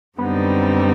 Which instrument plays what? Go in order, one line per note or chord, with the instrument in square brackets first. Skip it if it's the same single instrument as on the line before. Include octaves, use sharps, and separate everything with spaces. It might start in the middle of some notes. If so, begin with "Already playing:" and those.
[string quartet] F#2 D3 G3 C4 D#4 [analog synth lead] B3